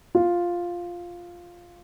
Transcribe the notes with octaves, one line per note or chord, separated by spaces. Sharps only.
F4